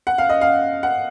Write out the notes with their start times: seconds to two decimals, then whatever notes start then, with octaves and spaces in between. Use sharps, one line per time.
0.07 F#5
0.18 F5
0.29 D#5
0.41 F5
0.83 F#5